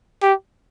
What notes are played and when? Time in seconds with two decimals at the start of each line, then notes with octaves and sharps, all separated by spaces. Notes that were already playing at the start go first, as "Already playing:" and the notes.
0.23 G4